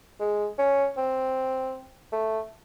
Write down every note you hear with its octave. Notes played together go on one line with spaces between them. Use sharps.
G#3
C#4
C4
A3